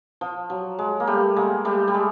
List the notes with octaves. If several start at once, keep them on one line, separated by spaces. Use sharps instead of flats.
F3
F#3
G#3
A#3
G3 A3
G#3 A#3
G3 A3
G3
G#3